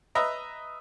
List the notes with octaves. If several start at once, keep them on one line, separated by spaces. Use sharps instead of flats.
B4 D#5 E5 A#5